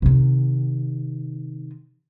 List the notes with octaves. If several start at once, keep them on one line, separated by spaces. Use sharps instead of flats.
C3 D#3